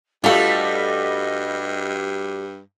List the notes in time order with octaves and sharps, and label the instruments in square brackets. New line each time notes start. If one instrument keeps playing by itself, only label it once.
[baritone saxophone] G2 [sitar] G3 A3 F#4 [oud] F4 A4 [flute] D#5